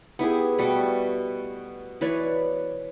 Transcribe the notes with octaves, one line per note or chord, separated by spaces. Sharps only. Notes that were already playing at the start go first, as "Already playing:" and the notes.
B3 E4 G4 G#4
B2 G3 A3
E3 B4 C#5 D5